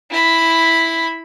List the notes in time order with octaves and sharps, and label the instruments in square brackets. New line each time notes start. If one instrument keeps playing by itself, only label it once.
[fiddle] E4 B5